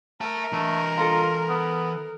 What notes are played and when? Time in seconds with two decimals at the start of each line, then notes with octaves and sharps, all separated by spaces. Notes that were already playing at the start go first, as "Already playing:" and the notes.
0.21 A#4 E5 A5
0.52 E3 A3 D#5
0.98 F4 A4 A#5
1.49 B3